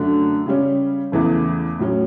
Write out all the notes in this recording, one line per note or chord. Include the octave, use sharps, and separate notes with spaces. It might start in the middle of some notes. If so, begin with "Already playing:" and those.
Already playing: F#2 D3 A3
C#3 G3 C#4
E2 C#3 E3 A3
A2 F#3 C#4